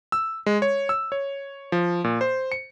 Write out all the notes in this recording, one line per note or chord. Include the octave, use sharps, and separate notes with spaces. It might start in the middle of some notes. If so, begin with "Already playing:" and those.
E6
G#3
C#5
E6
C#5
F3
A#2
C5
C#7